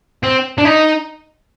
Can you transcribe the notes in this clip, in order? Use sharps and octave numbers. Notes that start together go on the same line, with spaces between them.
C4
D4
D#4